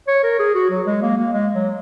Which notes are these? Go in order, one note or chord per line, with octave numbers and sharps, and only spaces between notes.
C#5
A#4
G#4
F#4
F#3
G#3
A#3
A#3
G#3
F#3